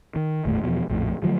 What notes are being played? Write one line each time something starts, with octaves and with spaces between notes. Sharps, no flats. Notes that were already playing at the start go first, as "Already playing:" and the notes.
D#3
G1 D#2 A2 A3
E2 B2 D3 F3
A#1 F2 A2
D3 F3 F#3 A3